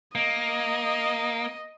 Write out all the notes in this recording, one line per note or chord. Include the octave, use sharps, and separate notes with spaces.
A#3 D#5